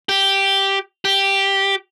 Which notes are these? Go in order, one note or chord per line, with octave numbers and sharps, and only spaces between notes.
G4
G4